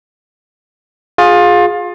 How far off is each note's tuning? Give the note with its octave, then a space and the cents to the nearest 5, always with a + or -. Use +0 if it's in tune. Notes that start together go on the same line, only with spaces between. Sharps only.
F4 +25 G#4 +0